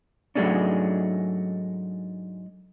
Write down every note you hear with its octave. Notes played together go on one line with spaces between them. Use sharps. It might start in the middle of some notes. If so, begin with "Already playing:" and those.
G#2 F#3 G#3 A3 C#4 D4